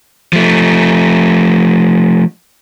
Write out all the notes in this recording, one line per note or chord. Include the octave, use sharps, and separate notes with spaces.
F3 A3